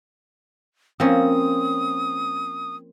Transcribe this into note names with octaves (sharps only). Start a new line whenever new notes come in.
F3 A#3 C4 C#4 D#6